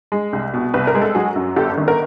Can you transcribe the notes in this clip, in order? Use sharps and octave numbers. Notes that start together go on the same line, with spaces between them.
G#3
C2
B2
C2 B4
A#4
G#3
A4
F#3 F#4 G#4
F#2
G1 G4 A4
D#3
A#4